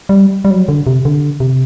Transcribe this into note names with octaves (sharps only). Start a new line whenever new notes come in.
G3
G3
F#3
D3
C3
D3
C3